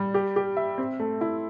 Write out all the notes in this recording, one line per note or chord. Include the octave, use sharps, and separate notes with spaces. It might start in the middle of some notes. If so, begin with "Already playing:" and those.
Already playing: G3
G4
G4
E5
C4
A3
E4